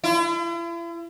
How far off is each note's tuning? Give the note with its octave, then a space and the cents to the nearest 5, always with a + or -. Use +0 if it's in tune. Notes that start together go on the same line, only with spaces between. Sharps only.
E4 +45